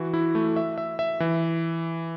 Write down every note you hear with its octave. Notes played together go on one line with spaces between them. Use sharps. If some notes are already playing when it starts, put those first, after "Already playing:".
Already playing: E3 F#4
E4
A3
E5
E5
E5
E3